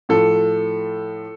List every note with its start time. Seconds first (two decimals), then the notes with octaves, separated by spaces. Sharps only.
0.09 A2 F3 A4